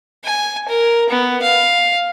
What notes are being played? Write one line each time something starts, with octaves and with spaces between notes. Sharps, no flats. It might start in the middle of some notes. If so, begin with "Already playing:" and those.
G#5
A#4
B3
F5